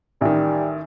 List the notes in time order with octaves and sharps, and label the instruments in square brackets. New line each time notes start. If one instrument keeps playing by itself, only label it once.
[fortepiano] A1 D#3 [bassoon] G3